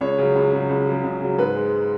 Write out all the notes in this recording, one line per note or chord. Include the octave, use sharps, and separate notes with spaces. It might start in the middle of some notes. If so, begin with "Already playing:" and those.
C#2 C#5
C#3 F#3
C#2
C#3 F#3
C#2
C#3 F#3
C#2
C#3 F#3
G#2 B4
G#3